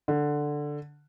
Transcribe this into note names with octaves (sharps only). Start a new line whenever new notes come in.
D3